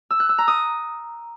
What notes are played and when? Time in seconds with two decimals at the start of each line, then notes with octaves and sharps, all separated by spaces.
0.11 E6
0.20 F#6
0.29 E6
0.38 A#5
0.48 D#6